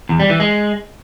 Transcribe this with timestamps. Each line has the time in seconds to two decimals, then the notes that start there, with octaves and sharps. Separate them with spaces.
0.09 E2
0.20 G3
0.30 E3
0.40 G#3